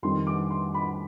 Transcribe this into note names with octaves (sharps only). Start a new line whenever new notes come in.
F2 D#3 G3 C6
D6
C6
B5